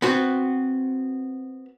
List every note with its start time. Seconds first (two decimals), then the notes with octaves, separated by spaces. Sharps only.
0.02 B3 C4 F#4